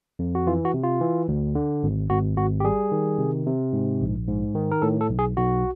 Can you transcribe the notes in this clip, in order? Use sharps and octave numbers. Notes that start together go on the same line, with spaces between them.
F2
F#4
E3 F4
F#4
C3
F4
E3
D2
D3
G#1
G#1 F#4
G#1 F#4
G4
G3 G#4
D#3
C3
C3
G#2
A#1
G#2
D#3
A#4
A2 A4
A4
B1
G#4
B1 F#4